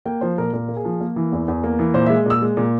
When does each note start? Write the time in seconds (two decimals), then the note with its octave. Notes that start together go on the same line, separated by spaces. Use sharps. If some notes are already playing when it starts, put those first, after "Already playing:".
0.06 A#3 G5
0.21 F3 C5
0.38 A#2 A#4
0.53 A#2 A#4
0.68 A#3
0.77 G#4
0.85 F3
1.01 A#3 A#4
1.16 E3
1.32 E2
1.48 E2
1.64 A#3
1.79 E3
1.94 A#2 C5
2.06 G#3 E5
2.26 A#2 E6
2.42 G#3
2.57 A#2